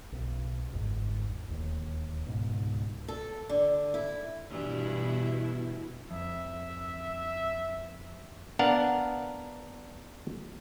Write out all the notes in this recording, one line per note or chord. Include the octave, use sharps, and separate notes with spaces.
B1
G1 E2 G#2
D1 D#2
C#2 G#2 B2
A4
D3
E4
G2 B2 E3 E4
F2 E5
B3 D4 A#4 F5 F#5